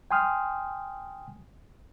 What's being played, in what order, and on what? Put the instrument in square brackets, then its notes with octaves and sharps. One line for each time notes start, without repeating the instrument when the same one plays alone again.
[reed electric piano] G5 G#5 C6 D#6 F6